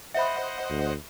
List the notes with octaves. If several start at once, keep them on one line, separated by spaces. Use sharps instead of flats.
C5 D#5 E5 F#5 B5
D2